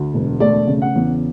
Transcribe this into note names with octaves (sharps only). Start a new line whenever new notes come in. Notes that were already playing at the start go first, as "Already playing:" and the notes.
Already playing: D2
E1
A3 D5
C#3
F#5
E2